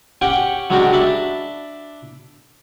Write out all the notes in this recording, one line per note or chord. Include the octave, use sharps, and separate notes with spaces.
C#4 G4 F#5 G5 C#6
F#3 G#3 C#4 D4 F#4 G4
D4 E5 A5 B5